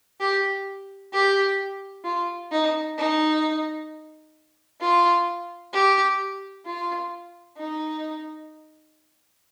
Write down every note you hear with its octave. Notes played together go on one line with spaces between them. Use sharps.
G4
G4
F4
D#4
D#4
F4
G4
F4
D#4